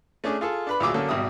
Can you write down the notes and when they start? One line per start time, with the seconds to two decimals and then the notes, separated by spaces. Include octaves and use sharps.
0.24 A3 C#4 D4 G#4
0.41 F4 G#4 A4
0.67 D4 B4 B5
0.80 D2 A#2 F#3 G#4 D6 E6
0.94 D3 F#3 A#3 C#4 A4
1.09 G#1 B2 G3 E5 D#6